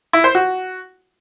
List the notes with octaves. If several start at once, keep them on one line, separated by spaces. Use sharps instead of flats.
E4
C5
F#4